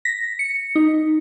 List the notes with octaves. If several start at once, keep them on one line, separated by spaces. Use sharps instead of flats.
A#6 B6
C#7
D#4